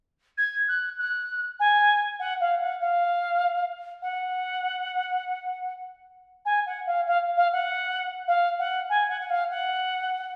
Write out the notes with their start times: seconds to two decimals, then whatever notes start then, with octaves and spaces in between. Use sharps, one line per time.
0.37 G#6
0.68 F#6
0.99 F#6
1.60 G#5
2.19 F#5
2.40 F5
2.61 F#5
2.80 F5
4.02 F#5
6.45 G#5
6.66 F#5
6.86 F5
7.07 F5
7.37 F5
7.52 F#5
8.28 F5
8.59 F#5
8.89 G#5
9.09 F#5
9.20 F#5
9.30 F5
9.50 F#5